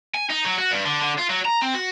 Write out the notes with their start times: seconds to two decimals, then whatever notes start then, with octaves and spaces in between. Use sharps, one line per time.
0.15 G#5
0.30 D#4
0.45 F#3
0.58 F#4
0.71 G2
0.85 D3
1.02 D3
1.18 F4
1.30 F#3
1.45 A#5
1.62 C4
1.74 F#4